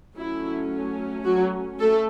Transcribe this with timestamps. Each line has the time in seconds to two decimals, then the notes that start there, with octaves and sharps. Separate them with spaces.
0.16 F#3 A3 C#4 E4
1.24 F#3 F#4
1.78 A3 A4